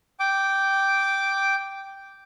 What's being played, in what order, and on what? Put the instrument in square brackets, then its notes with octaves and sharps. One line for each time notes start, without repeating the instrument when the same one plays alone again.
[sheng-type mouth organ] G5 D6